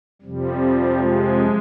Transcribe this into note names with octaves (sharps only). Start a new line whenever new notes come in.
F2 C3 F3 G3
G#3